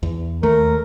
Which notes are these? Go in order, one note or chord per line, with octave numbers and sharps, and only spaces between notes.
E2
D#2 A3 A#4